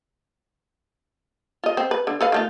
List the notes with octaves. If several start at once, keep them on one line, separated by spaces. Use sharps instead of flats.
F4 D#5
C4
B4
D3
A4 B4 F5
D#3 A3 F4